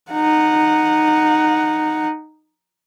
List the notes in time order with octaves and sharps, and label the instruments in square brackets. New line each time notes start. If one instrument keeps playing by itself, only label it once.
[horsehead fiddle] D#4 F#5